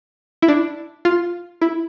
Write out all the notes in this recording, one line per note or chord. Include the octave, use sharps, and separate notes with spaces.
E4
D4
F4
E4